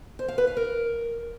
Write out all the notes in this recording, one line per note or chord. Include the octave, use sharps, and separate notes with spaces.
C5
F5
B4
F5
A#4